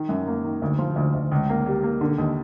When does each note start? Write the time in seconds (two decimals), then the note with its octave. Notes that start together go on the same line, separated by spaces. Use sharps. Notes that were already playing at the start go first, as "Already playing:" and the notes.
Already playing: D#3
0.09 F#2
0.27 A#3
0.44 D#3
0.62 D2
0.79 F3
0.96 D2
1.15 D2
1.31 C#2
1.49 A#3
1.66 G3
1.83 A#3
2.01 D3
2.18 D#2